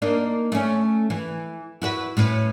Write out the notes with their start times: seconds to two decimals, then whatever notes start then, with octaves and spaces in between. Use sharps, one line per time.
0.02 A#3 D4 D#4
0.52 A3 C#4
1.10 E3
1.82 E4 F#4 B4
2.17 A2 C#4 B4